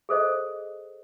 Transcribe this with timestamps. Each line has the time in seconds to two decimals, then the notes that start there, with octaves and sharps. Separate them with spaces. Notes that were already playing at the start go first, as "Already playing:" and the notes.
0.09 G#4 A4 C5 D#5